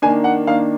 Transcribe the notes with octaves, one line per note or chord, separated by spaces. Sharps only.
D#3 A#3 D4 G#5
F#5
D#3 A#3 D4 F5